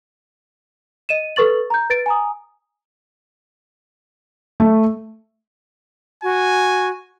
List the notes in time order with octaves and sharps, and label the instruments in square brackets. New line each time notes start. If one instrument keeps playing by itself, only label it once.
[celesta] D#5 D#7 E7
A4 B4 C#6 A6 F#7
A#5 G6
B4 A6 D7
G#5 A#5 D#6
[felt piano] A3
[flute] F#4 [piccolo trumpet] G#5